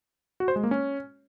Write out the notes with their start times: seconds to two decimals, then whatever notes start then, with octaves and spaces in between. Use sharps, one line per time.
0.40 F#4
0.48 C5
0.56 G#3
0.63 A#3
0.71 C#4